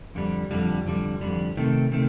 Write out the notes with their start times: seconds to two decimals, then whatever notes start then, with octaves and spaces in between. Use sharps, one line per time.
0.15 F2 D3 G3
0.51 F2 D3 G3
0.86 F2 D3 G3
1.21 F2 D3 G3
1.57 C3 D#3 A3
1.92 C3 D#3 A3